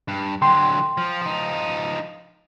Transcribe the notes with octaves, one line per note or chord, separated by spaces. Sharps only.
G2
D3 F#3 G5 C6
F3
F3 D#4